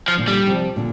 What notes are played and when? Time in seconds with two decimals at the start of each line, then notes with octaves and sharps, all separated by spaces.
0.08 F3
0.18 A#2 D3
0.28 G3
0.47 C3 F3
0.76 A#2 D3